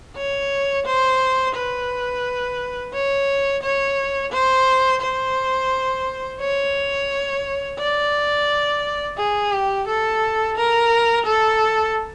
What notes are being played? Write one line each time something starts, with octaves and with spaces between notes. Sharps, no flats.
C#5
C5
B4
C#5
C#5
C5
C5
C#5
D5
G#4
G4
A4
A#4
A4